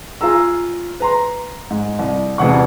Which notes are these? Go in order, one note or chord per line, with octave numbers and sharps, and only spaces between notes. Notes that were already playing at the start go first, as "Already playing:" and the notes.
F4 G#4 A#5 E6
B4 A#5 C6
G#2
C2
E1 A1 C3 F#5 C#6